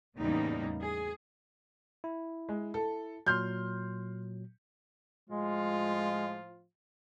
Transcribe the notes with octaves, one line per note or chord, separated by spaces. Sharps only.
E2 A2 C#3 G3 A#3 D#4
G#4
E4
G#3
A4
A#2 F#3 C6 F6 G6
A2 F3 G#3 F4